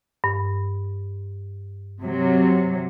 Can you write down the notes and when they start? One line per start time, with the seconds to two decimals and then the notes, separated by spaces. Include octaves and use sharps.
0.24 G2
2.01 C3 F#3